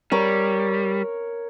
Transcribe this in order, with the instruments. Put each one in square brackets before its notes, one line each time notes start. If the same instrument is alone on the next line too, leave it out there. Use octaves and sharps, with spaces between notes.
[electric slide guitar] G3 [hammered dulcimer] A#4 C#5 C#6